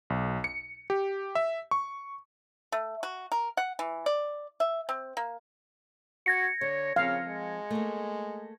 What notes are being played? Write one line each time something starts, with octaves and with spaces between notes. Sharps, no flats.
B1
C#7
G4
E5
C#6
A3
F#4
A#4
F#5
E3
D5
E5
C4
A#3
F#4 G#6 A#6 C#7
D3 C#5
C#3 F3 C4 F5
G#3
A3 A#3